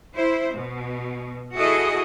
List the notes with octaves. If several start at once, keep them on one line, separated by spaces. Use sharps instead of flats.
E4 C5
B2
E4 F#4 G#4 A4 D#5